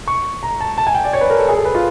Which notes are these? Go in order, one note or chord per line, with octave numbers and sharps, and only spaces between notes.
C#6
A#5
A5
A5
G#5
G5
D5
C#5
B4
A#4
A4
G#4
A4
B4
F4